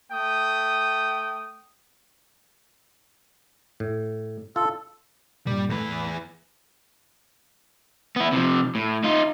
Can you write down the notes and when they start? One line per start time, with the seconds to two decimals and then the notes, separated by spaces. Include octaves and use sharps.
0.12 A3 G5 D#6
3.80 A2
4.56 F4 A4
5.47 G2 A#2 G3
5.69 E2 A2 A3 B4
8.16 B3 E4
8.32 C3 F3
8.75 A2
9.04 D#4 F4